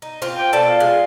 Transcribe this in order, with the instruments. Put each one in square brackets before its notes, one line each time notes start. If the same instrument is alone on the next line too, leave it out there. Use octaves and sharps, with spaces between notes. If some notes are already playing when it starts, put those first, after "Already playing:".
[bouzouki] D#4
C4 F4
[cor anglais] G5
[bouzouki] B2 D5 A5 [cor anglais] A4
[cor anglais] F4
[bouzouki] G#3